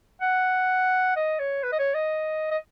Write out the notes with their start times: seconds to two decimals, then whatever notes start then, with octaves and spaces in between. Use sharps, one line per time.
0.21 F#5
1.16 D#5
1.39 C#5
1.63 B4
1.72 D#5
1.79 C#5
1.94 D#5
2.51 D#5